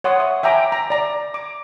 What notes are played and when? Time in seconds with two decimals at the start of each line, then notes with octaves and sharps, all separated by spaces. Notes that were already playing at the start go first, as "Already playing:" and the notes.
0.04 C#5 F#5 C6 D#6
0.18 E5 D#6
0.43 E5 G5 G#5 A#5 D6
0.72 A#5
0.90 D5 A#5
1.34 D6